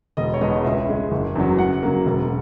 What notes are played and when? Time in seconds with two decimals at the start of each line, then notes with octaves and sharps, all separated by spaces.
0.17 E1 D#5
0.34 C#5
0.41 E2 B2 G#3 D#5
0.64 C#2 E5
0.88 C#3 G#3
1.12 F#1
1.35 E2 C#3 F#3
1.58 F#2 F#5
1.83 C#3 F#3 A#3
2.06 E1